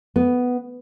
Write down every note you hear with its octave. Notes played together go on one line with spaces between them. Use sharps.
B3